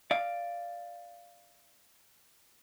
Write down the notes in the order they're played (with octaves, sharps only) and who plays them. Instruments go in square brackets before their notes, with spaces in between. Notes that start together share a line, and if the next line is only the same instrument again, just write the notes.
[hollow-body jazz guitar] D5 F5